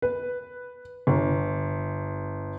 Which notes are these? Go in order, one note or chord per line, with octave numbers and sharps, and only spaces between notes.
B4
G1